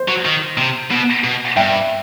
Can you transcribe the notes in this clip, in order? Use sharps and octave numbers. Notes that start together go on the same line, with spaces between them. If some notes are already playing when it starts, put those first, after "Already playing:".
Already playing: C5
F#3
D#3
C3
B2
B2
G2 E5 G5